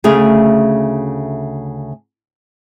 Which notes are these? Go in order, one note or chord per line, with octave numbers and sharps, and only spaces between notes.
D2 C#3 A3 G#4 F5